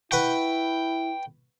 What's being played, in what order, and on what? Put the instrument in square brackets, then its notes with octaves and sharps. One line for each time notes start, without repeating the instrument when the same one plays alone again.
[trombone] E4 [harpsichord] B4 F#5 C#6 [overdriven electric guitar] G5